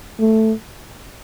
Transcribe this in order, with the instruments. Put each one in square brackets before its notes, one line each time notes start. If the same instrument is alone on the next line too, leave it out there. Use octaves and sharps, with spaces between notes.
[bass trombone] A3